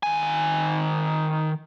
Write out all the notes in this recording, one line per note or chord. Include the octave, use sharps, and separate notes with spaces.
D#3 G#5